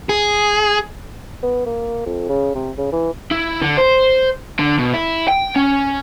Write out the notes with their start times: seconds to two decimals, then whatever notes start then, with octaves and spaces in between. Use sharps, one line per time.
0.09 G#4
1.43 B3
1.66 A#3
2.06 F2
2.29 C#3
2.55 C3
2.78 C#3
2.92 E3
3.32 E4
3.62 D3
3.78 C5
4.59 D3
4.79 B2
4.94 E4
5.29 G5
5.56 C#4